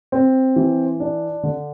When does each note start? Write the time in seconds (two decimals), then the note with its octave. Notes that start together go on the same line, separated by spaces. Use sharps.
0.12 C4
0.56 E3
1.00 D4
1.43 D3